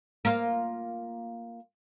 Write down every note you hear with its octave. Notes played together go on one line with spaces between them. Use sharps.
A#3 F4